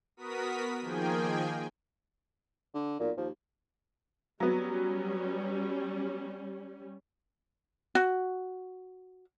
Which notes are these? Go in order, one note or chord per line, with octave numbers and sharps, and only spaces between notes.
B3 F#4 A#4 D#6 B6
D#3 F3 A#3 G#4 G5 G#5
D3
B1 A#2
D#2 F3
F#3 G3 B3 C#4
F#4